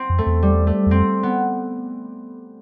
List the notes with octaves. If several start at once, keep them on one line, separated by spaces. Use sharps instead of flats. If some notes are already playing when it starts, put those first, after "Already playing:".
Already playing: C4
F2
A3
E2
G3
A3
E2
F2 C4
B3